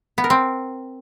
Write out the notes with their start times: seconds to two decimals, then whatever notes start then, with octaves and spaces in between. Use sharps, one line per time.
0.18 B3
0.24 A#4
0.30 C4